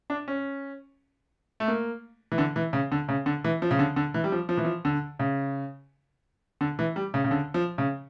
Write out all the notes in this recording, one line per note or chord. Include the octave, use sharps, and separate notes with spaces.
D4
C#4
A3
A#3
E3
D3
E3
C#3
D3
C#3
D3
E3
F3
C#3
D3
D3
E3
G3
F3
F3
E3
F3
D3
C#3
D3
E3
G3
C#3
C#3
D3
F3
C#3